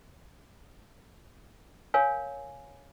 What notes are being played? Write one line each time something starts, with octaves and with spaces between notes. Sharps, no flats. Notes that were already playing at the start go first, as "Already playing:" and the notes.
A#4 C#5 F5 G#5